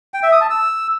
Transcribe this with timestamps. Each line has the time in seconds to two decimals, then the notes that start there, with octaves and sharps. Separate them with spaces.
0.14 G5
0.23 E5
0.32 D#6
0.41 A5
0.50 E6